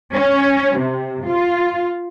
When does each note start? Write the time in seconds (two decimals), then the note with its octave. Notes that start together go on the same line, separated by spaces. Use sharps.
0.15 C#4
0.78 C3
1.28 F4